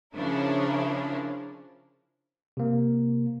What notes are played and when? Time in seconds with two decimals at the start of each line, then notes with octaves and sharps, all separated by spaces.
0.15 C#3 F3 C#4 D4 E4 A#4
2.57 C3 A#3